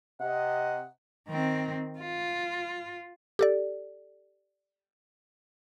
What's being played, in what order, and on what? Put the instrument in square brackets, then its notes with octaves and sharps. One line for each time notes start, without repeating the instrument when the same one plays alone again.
[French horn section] C3 D#5 [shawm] F#5
[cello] D#3 C4
F4
[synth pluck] G4 A4 D5